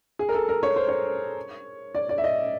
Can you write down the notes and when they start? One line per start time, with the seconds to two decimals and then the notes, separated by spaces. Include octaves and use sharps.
0.19 G#4
0.29 A#4
0.34 A4
0.49 A#4
0.63 C#5
0.76 C5
0.88 C#5
1.95 D5
2.09 D5
2.18 E5
2.24 D#5